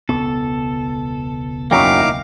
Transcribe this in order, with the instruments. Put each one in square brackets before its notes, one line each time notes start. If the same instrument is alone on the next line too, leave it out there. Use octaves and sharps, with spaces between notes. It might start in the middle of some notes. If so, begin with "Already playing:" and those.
[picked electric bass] E1 C#2 B3 [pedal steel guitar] A4
[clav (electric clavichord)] F#2 F#3 G5 [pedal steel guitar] A#3 D#4 E4 [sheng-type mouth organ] F5 D6